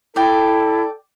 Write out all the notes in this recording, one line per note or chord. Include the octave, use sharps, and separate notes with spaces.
E4 A4 D5 G5